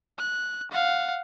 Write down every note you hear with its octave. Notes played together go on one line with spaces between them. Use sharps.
F#6
F5 F#5